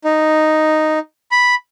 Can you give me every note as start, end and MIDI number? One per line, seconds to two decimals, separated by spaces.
0.04 0.99 63
1.31 1.55 83